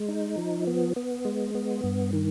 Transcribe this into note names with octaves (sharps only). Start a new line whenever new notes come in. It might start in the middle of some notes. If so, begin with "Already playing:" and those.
Already playing: G#3
D#4
F3
B3
B3
G#3
B3
G2
D#3